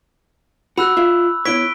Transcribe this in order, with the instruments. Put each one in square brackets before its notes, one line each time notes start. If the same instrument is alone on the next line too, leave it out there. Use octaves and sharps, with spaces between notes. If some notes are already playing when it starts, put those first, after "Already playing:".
[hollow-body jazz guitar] F#4 [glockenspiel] B5 E6 F#6
[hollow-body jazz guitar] F4 E5
[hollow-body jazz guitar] B3 E4 C#5 [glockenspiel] B6 D7 G7